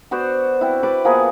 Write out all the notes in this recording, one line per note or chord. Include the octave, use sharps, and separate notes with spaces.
B3 F#4 C5 D5
C4 E4
B4 D5 B5 D6
F3 A#3 B3 G#4